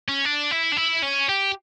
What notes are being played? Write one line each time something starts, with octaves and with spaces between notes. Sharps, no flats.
C#4
D4
E4
D4
E4
C#4
G4